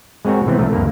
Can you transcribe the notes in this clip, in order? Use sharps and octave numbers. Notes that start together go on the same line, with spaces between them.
G#3 C4 F#4 A#4 C#5
A2 C3 E3 B3 C4
C2 F3 A3 A#4
D2 G2 A#3 A#4